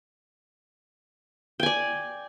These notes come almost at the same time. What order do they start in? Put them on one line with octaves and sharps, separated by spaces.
G5 G#5 D5